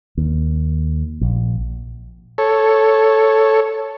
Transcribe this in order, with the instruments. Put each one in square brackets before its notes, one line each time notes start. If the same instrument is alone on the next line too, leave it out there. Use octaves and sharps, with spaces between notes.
[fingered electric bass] D#2
A#1
[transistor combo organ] A4 C#5